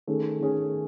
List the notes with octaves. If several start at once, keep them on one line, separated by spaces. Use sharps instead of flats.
D#3 A3 C#4 G#4
D#3 A3 C#4 G#4